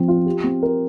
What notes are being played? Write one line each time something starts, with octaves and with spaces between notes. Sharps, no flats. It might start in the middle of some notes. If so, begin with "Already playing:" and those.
Already playing: F3 C4
F4
G4
C4
A#4